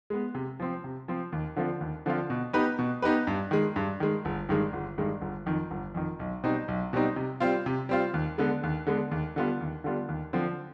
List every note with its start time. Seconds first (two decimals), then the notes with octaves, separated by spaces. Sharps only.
0.10 G#3 B3
0.35 C3
0.60 F3 C4
0.84 C3
1.08 F3 C4
1.32 D#2
1.56 D3 F3 C4 F4
1.81 D#2
2.06 D3 F3 C4 F4
2.30 B2
2.53 B3 D#4 G4 B4
2.79 B2
3.02 B3 D#4 G4 B4
3.27 G2
3.51 D#3 G#3
3.76 G2
4.00 D#3 G#3
4.25 G1
4.49 G2 D#3 G#3
4.73 G1
4.98 G2 D#3 G#3
5.21 G1
5.46 F2 D#3
5.71 G1
5.94 F2 D#3
6.19 B1
6.44 B2 G3 C4 D#4
6.68 B1
6.93 B2 G3 C4 D#4
7.16 C3
7.40 G3 C4 F4
7.66 C3
7.89 G3 C4 F4
8.14 D#2
8.38 D3 G#3 B3
8.63 D#2
8.87 D3 G#3 B3
9.11 D#2
9.36 D3 G3 B3 F4
9.61 D#2
9.84 D3 G3 B3 F4
10.09 D#2
10.33 D3 F3 C4